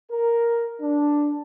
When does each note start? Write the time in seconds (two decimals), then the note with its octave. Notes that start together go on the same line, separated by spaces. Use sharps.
0.11 A#4
0.81 D4